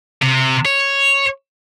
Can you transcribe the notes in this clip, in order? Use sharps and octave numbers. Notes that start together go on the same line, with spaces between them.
C3
C#5